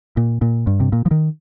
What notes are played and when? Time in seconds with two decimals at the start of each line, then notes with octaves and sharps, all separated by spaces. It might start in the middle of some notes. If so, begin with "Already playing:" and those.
0.17 A#2
0.42 A#2
0.67 G2
0.80 C3
0.93 A#2
1.06 F3
1.11 D#3